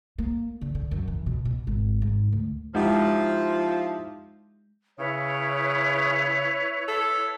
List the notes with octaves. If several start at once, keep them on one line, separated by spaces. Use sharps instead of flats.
A#3
D3
D3
F#2
E3
B2
B2
G#1
G#2
D2
F3 G#3 D#4 E4 G4
C#3 E4 B4 C#5
A4